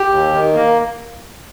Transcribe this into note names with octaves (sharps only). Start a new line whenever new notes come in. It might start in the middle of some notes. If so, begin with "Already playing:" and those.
Already playing: G4
D#2
D#3
A#3